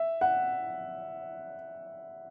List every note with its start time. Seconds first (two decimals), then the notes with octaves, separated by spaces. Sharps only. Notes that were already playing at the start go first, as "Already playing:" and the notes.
Already playing: E5
0.21 F#5